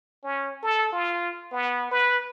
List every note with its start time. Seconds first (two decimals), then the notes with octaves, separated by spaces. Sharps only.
0.24 C#4
0.63 A4
0.92 F4
1.52 B3
1.91 B4